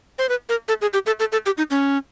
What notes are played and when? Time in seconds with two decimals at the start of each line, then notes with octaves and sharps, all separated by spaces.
0.18 C5
0.29 B4
0.49 A#4
0.68 A4
0.81 G#4
0.93 G4
1.06 A4
1.20 A4
1.32 A4
1.46 G4
1.58 D#4
1.71 C#4